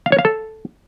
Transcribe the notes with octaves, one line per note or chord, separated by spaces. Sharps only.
F5
C#5
F5
A4